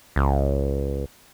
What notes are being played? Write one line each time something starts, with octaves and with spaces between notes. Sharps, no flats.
C#2